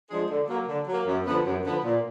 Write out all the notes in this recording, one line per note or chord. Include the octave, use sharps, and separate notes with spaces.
F3 G#3 D4 G#4
D3
F#3 A#3
D3
F#3 A#3
F#2
D3 F3 B3
F#2
D3 F3 B3
A#2